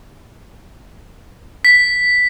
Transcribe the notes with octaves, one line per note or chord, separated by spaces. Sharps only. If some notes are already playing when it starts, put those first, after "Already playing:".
B6